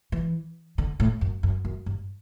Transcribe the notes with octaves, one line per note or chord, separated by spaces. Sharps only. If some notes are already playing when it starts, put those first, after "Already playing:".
E3
D3
A2
F#2
F#2
F#2
G2